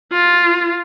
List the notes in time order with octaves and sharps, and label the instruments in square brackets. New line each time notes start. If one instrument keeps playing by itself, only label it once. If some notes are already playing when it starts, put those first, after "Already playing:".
[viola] F4